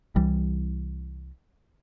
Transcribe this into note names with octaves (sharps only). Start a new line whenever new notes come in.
C2 E3 G3